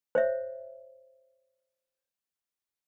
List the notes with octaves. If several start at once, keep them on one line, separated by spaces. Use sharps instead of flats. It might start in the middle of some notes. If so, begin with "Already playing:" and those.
C5 C#5 E5